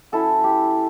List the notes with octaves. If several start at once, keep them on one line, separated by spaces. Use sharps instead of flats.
F#3 C#4 E4 A4
G4